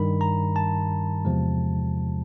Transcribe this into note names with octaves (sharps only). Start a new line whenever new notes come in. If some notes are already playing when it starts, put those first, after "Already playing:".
Already playing: G2 D#3 G3 B5
A#5
A5
E2 C3 F3 G#3